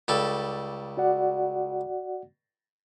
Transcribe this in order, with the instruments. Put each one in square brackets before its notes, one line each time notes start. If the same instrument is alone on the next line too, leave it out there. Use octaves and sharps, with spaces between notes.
[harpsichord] C#2 G3 A4
[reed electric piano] F#4 D5 F#5